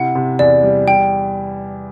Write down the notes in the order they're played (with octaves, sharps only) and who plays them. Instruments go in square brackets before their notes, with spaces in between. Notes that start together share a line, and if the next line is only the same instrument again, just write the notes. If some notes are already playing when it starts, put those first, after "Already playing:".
Already playing: [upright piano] C3 E4 [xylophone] F#5
[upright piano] C3
[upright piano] E2 [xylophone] D5
[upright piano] G3
[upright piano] G3 [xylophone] G5